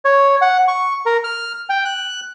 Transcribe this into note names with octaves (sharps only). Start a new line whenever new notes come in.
C#5
F#5
C#6
A#4
F6
G5
F#6